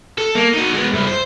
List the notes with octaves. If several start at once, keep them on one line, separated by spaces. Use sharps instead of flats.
A4
A#3
D#4 F#4
G#3 B3
G2 E4
C5